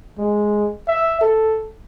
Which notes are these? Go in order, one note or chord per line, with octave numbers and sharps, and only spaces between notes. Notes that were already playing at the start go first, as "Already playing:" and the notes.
G#3
E5
A4